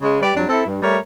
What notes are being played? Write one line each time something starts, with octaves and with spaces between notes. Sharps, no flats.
C#3 G#3
G3 G4 B4 D5
F2 F#3 G3 D4
C4 E4 A4
G2
G3 A3 A#4 C#5